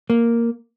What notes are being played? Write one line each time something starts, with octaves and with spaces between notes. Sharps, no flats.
A#3